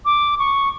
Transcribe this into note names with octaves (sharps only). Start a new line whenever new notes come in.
D6
C#6